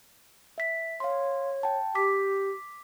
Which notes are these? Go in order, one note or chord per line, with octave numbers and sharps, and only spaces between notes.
E5 B6
C#5 F5 C6
G5 A5
G4 D6 B6